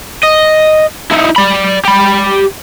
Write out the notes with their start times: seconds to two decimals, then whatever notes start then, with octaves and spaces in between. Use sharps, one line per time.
0.24 D#5
1.11 D#4 E4
1.36 D5 B5
1.85 G4 B5